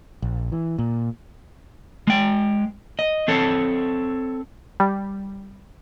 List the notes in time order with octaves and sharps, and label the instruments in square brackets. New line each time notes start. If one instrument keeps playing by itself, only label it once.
[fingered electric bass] A#1
E3
A#2
[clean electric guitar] G#3 G5
D#5
C4 A4 C#5
[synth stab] G3